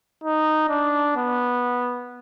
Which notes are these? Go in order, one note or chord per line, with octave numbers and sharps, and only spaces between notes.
D#4
D4
B3